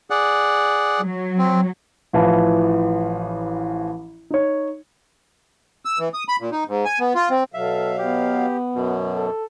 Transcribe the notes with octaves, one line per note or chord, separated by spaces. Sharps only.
G#4 D5 F#5
F#3
C4
A1 E3 F3
D#4 C#5
E6
E3
D#6
B5
A#2
D#4
G#2
G#5
B3
F4
C4
B2 F#3 A4 E5 F5
B3 G4
F#2 B2 F#3
A4